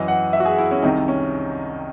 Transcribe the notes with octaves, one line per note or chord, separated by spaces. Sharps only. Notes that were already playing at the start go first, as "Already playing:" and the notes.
Already playing: F#2 E3 D#5
F#5
E5
F#4
G#4
E4
C#4
C2 C3 D#3 D#4
C#4